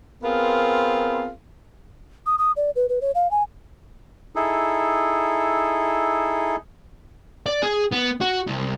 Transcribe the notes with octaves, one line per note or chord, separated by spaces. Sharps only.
B3 C4 F4 G#4 A#4
D#6
D#6
D5
B4
B4
C#5
F5
G#5
D#4 E4 G#4 A4
D5
G#4
B3
F#4
C2